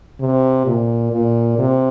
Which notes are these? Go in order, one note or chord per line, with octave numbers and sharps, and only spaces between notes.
C3
A#2
A#2
C3